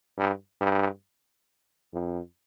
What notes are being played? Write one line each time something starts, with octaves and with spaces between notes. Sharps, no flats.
G2
G2
F2